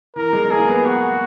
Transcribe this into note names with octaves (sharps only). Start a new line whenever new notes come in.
E3 A#4
G#3
A#3 G#4
B3
F#4